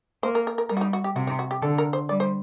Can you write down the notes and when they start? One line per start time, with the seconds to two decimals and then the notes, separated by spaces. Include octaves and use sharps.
0.23 A#3 C5
0.35 A#4
0.47 A#4
0.58 A#4
0.69 G3 A#4
0.77 F#4
0.81 D#4
0.93 F#4
1.04 G4
1.16 C3 F#4
1.27 D#4
1.39 F#4
1.51 G4
1.62 D3 A4
1.78 A#4
1.93 C5
2.09 G3 D5
2.20 C5